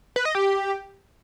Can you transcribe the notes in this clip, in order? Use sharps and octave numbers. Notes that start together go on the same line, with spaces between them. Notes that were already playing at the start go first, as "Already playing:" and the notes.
B4
D#5
G4